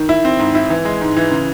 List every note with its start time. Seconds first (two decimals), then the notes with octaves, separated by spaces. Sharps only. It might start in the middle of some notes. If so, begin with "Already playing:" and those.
Already playing: D#3
0.09 E4
0.25 C4
0.39 G#2
0.55 E4
0.70 E3
0.85 G#3
1.01 G#2
1.17 E3
1.31 C#3